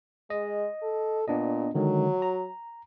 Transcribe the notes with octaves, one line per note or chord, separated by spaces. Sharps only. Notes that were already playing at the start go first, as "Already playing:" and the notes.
G#3 D#5
A4
A#2 B3 D4 D#5
D3 D#3 F#3 G#3
A#5